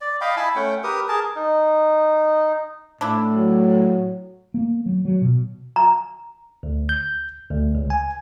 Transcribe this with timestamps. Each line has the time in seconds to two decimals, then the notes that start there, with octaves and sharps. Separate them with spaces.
0.01 D5
0.21 D#5 F5 G5 B5
0.37 E4 G#5 A5 B5
0.56 A3 C#4 F#5 G5
0.84 G4 A#4 B4 D#6
1.08 G#4 A#4 A5
1.36 D#4
3.01 A2 D4 E4
3.34 F#3
4.54 A#3
4.86 F#3
5.05 F#3
5.22 B2
5.76 A#5
6.63 D2
6.89 G6
7.51 D2
7.75 C#2
7.90 G#5